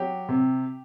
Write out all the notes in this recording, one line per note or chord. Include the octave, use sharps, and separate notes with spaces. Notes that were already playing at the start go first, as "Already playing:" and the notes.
Already playing: F#3 G4
C3